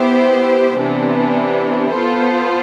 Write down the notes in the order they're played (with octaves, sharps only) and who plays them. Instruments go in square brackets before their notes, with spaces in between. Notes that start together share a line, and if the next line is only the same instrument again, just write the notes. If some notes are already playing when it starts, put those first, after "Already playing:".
Already playing: [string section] B3 E4 G4 C5
C3 E3 B3 D4
B3 F4 A4 C5